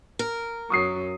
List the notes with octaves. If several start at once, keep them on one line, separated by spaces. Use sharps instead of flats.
A#4
F#2 F#3 C#6 D#6 C7